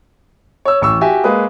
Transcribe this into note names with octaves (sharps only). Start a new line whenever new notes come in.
C#5 E6
A1 C#6 E6
F#4 G4 E5 G#5
G#3 A#3 B4 D#6